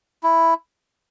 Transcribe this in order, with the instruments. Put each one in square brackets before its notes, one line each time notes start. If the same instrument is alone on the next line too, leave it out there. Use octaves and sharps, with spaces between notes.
[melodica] E4